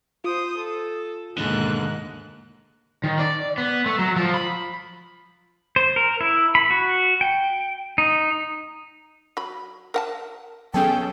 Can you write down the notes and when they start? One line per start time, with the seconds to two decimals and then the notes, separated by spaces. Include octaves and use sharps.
0.24 F4 C5 D#6
0.57 A4
1.38 D#2 G#2 B2 D3 A#3 F#6
3.04 D#3
3.19 D5
3.58 B3
3.86 A3
3.99 F#3
4.16 F3
4.34 B5
5.76 C5
5.96 A#4
6.21 E4
6.55 B5
6.71 F#4
7.21 G5
7.98 D#4
9.37 F#3 B5
9.94 A#4 F#5 A5
10.74 F#3 B3 C#4 G#4 A4 G5